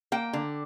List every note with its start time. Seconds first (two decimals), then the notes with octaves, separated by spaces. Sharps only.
0.12 A#3 G5
0.33 D3